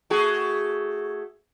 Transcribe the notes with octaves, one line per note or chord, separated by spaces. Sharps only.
A3 F#4 G#4